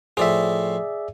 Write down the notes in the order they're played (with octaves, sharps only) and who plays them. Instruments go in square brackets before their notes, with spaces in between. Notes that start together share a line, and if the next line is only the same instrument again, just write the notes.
[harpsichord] A2 F3 [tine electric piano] G#4 D5 E5